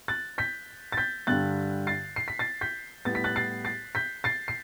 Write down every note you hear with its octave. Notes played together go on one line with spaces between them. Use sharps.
F#6 A6
G6 B6
A6
G6 B6
G2 D3 G3 F#6 A6
A6 C7
C7
B6
A6 C7
G6 B6
A2 G3 B3 A6
B6
F#6 A6
A6 C7
A6 C7
G6 B6
A6 C7
C7